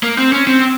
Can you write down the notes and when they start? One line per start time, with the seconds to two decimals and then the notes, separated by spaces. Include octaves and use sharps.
0.03 A#3
0.18 C4
0.32 C#4
0.47 C4